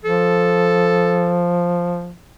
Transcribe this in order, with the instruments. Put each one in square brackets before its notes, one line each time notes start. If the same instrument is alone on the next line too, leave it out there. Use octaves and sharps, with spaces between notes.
[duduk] F3 [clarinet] A4